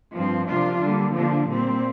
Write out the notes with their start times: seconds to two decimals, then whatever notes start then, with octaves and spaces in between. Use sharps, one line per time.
0.15 G2 F3 C4
0.48 C3 F3 A#3 D4 F4
0.81 D3 G3 A#3
1.15 D3 F3 D4
1.49 A#2 G3 C4